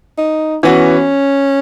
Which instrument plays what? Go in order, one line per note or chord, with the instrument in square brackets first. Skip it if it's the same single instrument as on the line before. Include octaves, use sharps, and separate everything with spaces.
[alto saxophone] D#4
[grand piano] E3 B3 F#4 [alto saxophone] C#4